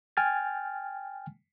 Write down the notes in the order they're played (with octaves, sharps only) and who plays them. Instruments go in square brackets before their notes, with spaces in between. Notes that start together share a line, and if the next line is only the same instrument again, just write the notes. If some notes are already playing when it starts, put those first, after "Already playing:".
[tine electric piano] G5 G#5 F6 G#6 A6